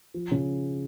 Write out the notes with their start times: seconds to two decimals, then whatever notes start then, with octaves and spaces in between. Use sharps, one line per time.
0.14 F3
0.31 C#3